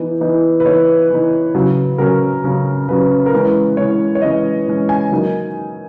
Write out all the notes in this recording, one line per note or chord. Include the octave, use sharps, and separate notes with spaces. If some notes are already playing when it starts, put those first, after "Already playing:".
Already playing: E3 B3 D#4
E3 B3 D#4
B4
E3 B3 D#4 C#5
E3 B3 D#4
C#3 F#3 C#4
C#3 F#3 C#4 A#4
C#3 F#3 C#4
C#3 F#3 C#4 B4
A#4
E3 G#3 C#4 B4
E3 G#3 C#4 C#5
C#5
E3 G#3 C#4 D#5
E3 G#3 C#4
G#5
D#3 F#3 A#3 D#4